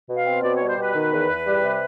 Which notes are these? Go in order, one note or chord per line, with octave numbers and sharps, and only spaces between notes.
B2
F5
C4
B2 D5
G3 C#5
C5
B2 B4
D#3
E2
E2
G3
C3